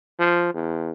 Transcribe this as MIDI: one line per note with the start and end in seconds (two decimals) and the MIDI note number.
0.19 0.52 53
0.54 0.91 40